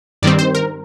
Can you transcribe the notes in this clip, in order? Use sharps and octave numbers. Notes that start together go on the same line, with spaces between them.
G2 D#3 G3 C4 D5
C5
A#4